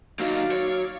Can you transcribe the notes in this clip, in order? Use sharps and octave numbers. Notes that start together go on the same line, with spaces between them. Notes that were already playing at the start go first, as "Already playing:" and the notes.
F#3 A#3 D#4 D5 F5
C#5